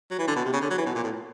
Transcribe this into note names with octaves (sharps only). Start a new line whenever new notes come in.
F#3
E3
D3
B2
C3
C#3
D3
F#3
E3
B2
A#2
A2